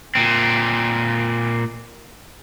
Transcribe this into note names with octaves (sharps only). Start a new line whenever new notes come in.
A#2 C4